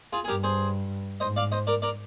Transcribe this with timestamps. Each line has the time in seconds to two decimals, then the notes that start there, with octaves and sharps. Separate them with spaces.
0.13 F4 G#4
0.24 G#4
0.28 G2 G4 A#4
0.43 G#4 C5
1.20 G#2 C5 D#5
1.36 D5 F5
1.52 C5 D#5
1.67 A#4 D5
1.82 A#4 D5